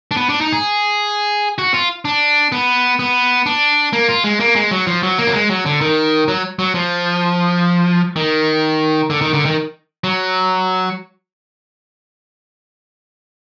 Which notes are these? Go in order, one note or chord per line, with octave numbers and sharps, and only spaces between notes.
D4
B3
D4
D#4
G#4
F#4
F4
D4
B3
B3
D4
A#3
F4
G#3
A#3
G#3
F#3
F3
F#3
A#3
F#3
G#3
F#3
D3
D#3
F#3
F#3
F3
D#3
D3
D#3
D3
D#3
F#3